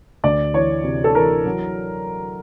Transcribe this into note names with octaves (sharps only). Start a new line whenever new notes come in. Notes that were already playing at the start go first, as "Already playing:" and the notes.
D2 D5
E3 C#5
C3
A4
E3 A#4
F#3